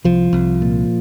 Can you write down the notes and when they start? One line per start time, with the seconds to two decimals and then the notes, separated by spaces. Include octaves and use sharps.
0.04 C2 F3
0.33 C2
0.62 A#2